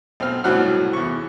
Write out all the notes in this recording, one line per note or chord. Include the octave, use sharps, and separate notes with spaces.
B1 C4 F6
C2 A2 F#3 F#4 F#5 F6
E2 C#6